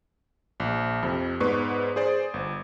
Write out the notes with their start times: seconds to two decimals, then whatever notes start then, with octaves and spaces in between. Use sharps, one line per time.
0.60 A#1
1.03 F2 C3
1.40 G#2 B3 B4 D5 C#6
1.96 G#4 C5 D5
2.34 G1